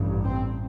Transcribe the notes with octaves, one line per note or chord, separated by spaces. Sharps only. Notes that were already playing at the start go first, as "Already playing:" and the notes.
Already playing: A1 G2
C4